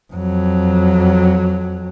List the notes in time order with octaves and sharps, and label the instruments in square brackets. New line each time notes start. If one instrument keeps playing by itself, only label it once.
[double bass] F2 F#3